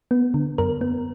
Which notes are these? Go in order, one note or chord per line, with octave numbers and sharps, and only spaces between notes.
B3
D3
F#2 A#4
B3